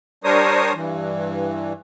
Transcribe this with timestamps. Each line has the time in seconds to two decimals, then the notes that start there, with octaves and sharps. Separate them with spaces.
0.24 G3 D4 A#4 C5 C#5 D#6
0.75 G2 E3